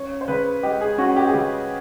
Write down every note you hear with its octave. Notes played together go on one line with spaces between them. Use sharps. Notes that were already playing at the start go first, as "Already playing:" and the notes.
Already playing: C#4 C#5
C5
C#3 B4
G#3 G4
G#4
C#4 F#4
G4
G#4
C#3 G4